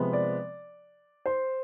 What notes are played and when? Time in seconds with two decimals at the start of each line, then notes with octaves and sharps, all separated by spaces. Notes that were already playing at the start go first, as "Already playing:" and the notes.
Already playing: C3 F3 G#3 B3
0.13 D5
1.26 C5